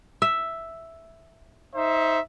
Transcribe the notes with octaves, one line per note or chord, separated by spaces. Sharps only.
E5
D#4 C5 E5